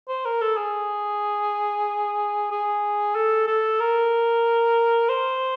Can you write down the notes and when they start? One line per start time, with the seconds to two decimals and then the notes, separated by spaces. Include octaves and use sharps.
0.08 C5
0.25 A#4
0.41 A4
0.57 G#4
2.51 G#4
3.15 A4
3.47 A4
3.80 A#4
5.09 C5